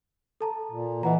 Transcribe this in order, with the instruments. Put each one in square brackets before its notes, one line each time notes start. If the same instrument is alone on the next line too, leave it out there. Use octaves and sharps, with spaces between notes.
[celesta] A4 A5 A#5
[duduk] A#2
[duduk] E3 [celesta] D#5 F#5 A#5